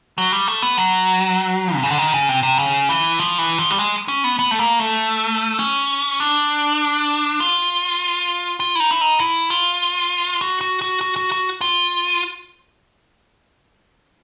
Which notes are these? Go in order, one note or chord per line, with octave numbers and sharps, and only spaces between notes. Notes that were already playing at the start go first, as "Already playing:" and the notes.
F#3
G3
A3
B3
F#3
C3
C#3
D3
D#3
C#3
C3
C3
C#3
E3
F3
E3
F3
G3
G#3
C#4
B3
B3
A3
A#3
A3
C#4
D4
F4
F4
E4
D#4
E4
D#4
E4
F4
F#4
F#4
F#4
F#4
F#4
F#4
F4